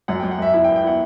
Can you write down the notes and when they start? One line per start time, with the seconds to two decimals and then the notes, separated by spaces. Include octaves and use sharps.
0.08 F#2 F#5
0.20 F#2 G5
0.31 F#5
0.39 F#2 E5
0.54 E4 E5
0.64 G5
0.69 B3
0.76 G5
0.83 E4 F#5